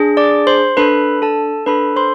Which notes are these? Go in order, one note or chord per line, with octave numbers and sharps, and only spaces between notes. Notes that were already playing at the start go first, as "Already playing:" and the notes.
Already playing: D4 G#4
D5 D6
C5 C6
D4 A4 B4 B5
A4 A5
D4 A4 B4 B5
C5 C6